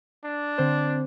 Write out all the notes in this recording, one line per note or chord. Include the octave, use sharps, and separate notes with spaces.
D4
D3 C4 C5